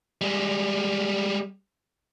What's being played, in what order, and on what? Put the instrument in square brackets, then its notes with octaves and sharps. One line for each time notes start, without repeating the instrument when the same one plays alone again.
[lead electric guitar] G3 G#3